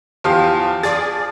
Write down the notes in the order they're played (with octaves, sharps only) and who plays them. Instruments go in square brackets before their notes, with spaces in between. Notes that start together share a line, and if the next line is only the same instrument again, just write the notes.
[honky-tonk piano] E2 G4 F5 [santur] F3
[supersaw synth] G#4 D5 [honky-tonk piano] A6